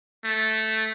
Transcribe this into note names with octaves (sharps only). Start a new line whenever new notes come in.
A3